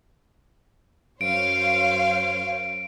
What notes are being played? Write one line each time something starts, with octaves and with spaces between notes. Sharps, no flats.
F#2 C5 C#5 F5 D7